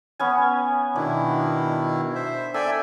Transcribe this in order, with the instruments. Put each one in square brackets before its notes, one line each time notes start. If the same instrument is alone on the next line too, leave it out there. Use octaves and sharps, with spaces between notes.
[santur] B3 C#4 G#5
[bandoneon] B2 D#3 E4 [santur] D4
[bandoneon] C5 E5
[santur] A4 E5 E6 [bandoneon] D5 G5 G#5